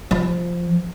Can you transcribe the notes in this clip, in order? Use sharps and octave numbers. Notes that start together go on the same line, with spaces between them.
F3